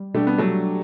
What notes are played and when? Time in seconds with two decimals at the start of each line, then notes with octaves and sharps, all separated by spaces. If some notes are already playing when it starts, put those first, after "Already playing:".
Already playing: G3
0.14 B2 G3 A3 D4 G4
0.27 B3
0.38 F#3 A3